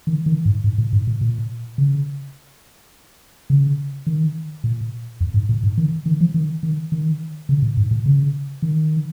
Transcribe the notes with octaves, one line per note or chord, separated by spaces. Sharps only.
D#3
D#3
G#2
G#2
A#2
G#2
A#2
A#2
C#3
C#3
D#3
A#2
F2
G#2
A#2
G#2
D#3
D#3
F3
D#3
D#3
D#3
C#3
A#2
G#2
A#2
C#3
D#3